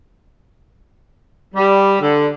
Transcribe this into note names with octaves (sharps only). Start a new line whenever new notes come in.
G3
D3